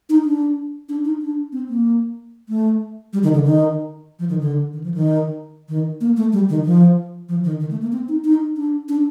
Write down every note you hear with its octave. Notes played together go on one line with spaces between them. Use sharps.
D#4
D4
D4
D#4
D4
C4
A#3
A3
G3
D#3
D3
D#3
F3
D#3
D3
D#3
F3
D#3
D#3
A#3
A3
G3
D#3
F3
F3
D#3
D#3
A3
A#3
C4
D#4
D#4
D4
D4